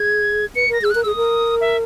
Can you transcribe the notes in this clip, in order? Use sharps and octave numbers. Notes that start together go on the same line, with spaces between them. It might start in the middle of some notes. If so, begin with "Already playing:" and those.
Already playing: G#4 G#6
B4 C#7
A#4 A#6
G#4 E6
A#4 F#6
G#4 D#6 E6
A#4
E5